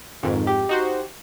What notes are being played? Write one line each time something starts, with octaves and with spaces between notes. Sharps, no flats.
F2 G#2 D#3
G4
D#4 F#4 C5